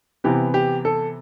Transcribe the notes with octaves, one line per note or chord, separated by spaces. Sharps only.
C3 E3 B3 G4
G4
A4